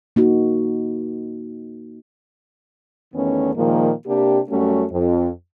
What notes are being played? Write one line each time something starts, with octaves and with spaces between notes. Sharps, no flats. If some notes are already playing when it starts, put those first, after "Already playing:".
A#3 D#4 F#4
E2 D#3 A3 B3 C#4
A#2 D#3 F3 G#3 A#3
C3 A#3 D4 G4
F#2 G3 A3 C#4 F#4
F2